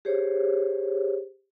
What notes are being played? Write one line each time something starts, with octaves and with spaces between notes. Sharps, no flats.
G4 G#4 C5 C#5